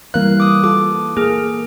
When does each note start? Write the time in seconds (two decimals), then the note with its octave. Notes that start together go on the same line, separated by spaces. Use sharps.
0.14 E3 G3 A#3 A#4 F5 F#6
0.40 D6 D#6
0.64 F4 A4 D6
1.17 A#3 G#4 F6